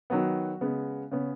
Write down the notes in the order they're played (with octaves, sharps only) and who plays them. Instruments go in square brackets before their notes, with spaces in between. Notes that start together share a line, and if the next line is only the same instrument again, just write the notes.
[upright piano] D#3 F#3 B3 F#4
C#3 G#3 B3
C#3 B3 C#4